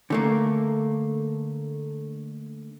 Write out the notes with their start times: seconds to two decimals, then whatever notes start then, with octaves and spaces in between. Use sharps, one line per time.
0.10 D3 A3 A#3